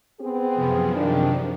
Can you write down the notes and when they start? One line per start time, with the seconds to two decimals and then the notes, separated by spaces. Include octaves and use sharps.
0.21 B3 C4 G#4
0.54 F#2 C3 F3
0.95 D#3 D4